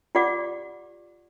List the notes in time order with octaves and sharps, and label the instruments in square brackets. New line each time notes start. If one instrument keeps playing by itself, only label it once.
[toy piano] F4 G4 D5 F#5 D6